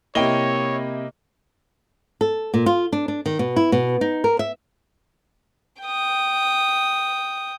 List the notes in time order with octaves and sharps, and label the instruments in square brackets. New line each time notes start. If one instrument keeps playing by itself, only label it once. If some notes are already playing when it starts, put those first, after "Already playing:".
[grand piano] C3 G5 G7 [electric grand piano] A#3 E4 D#5 [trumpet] C#5
[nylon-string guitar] A4
A#2
F4
D4
D4
D#3
B2
E4
B2
D#4
A#4
E5
[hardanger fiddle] G5 D#6